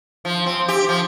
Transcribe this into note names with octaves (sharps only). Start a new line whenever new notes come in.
F3
C4
G4
F3